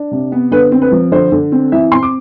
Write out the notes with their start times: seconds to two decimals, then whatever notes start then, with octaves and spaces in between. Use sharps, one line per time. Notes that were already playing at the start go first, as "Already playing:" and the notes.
Already playing: D4
0.11 C3
0.32 B3
0.51 D3 B4
0.72 C4
0.82 B4
0.92 F3
1.12 D3 C5
1.32 D3
1.52 C4
1.72 E3 E5
1.92 C4 C6
2.03 D6